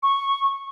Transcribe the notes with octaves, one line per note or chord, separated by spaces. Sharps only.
C#6